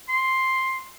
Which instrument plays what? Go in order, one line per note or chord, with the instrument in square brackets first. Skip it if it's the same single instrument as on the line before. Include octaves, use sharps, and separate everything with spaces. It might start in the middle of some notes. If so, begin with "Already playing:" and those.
[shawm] C6